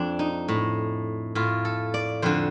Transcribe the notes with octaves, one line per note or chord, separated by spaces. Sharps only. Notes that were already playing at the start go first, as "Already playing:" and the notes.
Already playing: F2 C4 D4
D#4
A2
A2 F4
A4
D5
F2 D3 C5